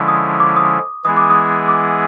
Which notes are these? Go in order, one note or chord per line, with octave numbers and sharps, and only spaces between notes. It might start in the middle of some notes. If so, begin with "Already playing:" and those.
Already playing: D3 F3 G#3 C#4 E4
D#6
D6
D#6
E3 G#3 B3 E4 G#4 D#6
D6
D#6
D6